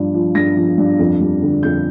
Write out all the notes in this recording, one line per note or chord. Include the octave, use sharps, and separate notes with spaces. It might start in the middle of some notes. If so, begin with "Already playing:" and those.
Already playing: G2 F3
F3
G2 A#6
F3
G2
F2
G3
D3
F2 G6